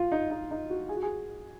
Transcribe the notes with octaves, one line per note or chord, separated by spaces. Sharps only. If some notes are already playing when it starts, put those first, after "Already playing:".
Already playing: F4
D#4
D#4
D#4
F#4
G#4
F#4
G#4